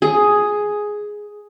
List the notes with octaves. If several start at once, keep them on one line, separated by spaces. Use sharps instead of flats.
G#4